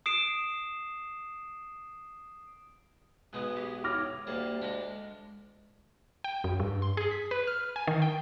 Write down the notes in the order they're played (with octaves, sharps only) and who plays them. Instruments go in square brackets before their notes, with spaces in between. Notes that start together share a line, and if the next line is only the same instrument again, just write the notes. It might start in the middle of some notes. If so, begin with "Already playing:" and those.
[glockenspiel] D#6 C7 D7 E7
[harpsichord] B1 G#3 B3 [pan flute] B4
[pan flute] G4
[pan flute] C#5 [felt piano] D6 F6 A#6
[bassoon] D2 [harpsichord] G3 A5 [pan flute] A#3
[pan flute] G#3 [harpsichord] D4
[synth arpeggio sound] G5
F#2
G2
C6
G#4
B6
B4
F6
G#5
D#3
G5